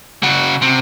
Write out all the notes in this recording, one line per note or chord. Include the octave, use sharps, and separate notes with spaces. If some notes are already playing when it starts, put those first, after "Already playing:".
C#3 F#4
C3